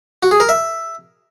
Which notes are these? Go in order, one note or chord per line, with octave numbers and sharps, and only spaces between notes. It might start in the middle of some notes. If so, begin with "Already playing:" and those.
F#4
G#4
A#4
E5